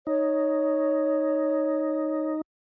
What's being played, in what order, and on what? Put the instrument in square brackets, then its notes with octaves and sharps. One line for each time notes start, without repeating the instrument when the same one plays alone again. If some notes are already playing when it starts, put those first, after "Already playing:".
[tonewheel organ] D#4 [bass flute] C#5